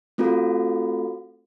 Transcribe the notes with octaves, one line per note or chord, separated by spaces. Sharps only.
A3 C4 F4 F#4 A4